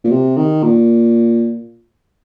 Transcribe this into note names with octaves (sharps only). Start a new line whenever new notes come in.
A#2
C3
D#3
A#2